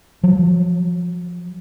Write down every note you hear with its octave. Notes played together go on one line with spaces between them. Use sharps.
F3 F#3